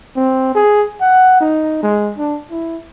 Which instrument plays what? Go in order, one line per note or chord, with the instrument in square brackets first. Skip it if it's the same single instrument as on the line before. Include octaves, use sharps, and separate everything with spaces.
[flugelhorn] C4
G#4
F#5
D#4
G#3
D4
E4